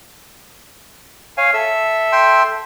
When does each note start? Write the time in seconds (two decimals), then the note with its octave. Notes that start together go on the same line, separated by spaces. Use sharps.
1.37 C#5 F5 G#5
1.54 A4 E5 E6
2.12 G5 C6